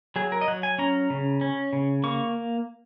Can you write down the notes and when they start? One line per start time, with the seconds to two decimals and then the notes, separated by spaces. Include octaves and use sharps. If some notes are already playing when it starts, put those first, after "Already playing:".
0.16 F#3 G#4
0.32 A#4
0.41 D#5
0.48 F#3 F#5
0.63 G#5
0.78 C#4 A#5
1.10 C#3
1.41 C#4
1.73 C#3
2.04 A#3 C#6